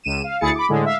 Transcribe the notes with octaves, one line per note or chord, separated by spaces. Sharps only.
C#2 D#7 E7
F5
D2 E4 G#4 A6 C#7
B5 D6
A2 D3 G#3
E5 F5